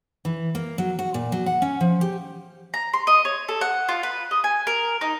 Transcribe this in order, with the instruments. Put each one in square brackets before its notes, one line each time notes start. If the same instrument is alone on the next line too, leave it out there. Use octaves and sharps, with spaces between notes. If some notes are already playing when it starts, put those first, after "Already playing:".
[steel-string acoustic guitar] E3
A#3
F#3
F#4
A#2
F#3
F#5
C#4
F3
G4
[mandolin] A#5
C6
D#5
C#5
A4
F#5
F4
B4
D#5
G#5
A#4
D#4